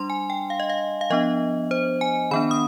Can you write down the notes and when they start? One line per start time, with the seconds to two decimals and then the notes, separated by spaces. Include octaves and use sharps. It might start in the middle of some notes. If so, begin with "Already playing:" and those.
Already playing: G3 D4 C6
0.10 G#5
0.30 G5
0.50 F5
0.60 D#5
0.69 F5
1.01 F5
1.10 F3 B3 D4 D#5
1.71 C5
2.01 G#5
2.31 D#3 B3 D4 B5
2.51 D#6